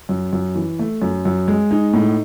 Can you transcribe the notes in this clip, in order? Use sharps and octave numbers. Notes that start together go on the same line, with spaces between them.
F#2
F#2
E3
A3
F#2
F#2
G#3
D#4
A2